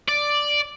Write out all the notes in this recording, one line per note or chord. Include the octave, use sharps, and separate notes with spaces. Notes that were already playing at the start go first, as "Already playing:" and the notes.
D5